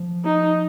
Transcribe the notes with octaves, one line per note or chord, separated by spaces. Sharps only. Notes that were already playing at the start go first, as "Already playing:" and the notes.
Already playing: F3
D#4